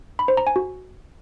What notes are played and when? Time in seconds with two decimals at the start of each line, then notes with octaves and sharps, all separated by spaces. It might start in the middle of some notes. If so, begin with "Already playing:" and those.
0.19 B5
0.28 C5
0.37 A#5
0.47 G#5
0.56 F#4